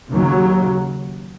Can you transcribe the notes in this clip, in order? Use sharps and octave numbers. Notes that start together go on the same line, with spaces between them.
D#2 C#3 F#3